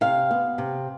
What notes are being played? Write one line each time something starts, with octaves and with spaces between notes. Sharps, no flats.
C3 F5
B3
C3